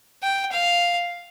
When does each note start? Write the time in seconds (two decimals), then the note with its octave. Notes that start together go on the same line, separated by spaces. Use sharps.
0.23 G5
0.52 F5